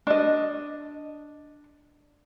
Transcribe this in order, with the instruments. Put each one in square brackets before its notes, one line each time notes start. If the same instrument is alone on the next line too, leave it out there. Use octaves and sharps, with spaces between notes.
[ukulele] D4 D#5